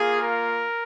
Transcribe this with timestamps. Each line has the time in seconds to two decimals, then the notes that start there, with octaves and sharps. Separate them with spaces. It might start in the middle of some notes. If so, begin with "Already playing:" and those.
Already playing: A#3 F4 G#4
0.22 A#4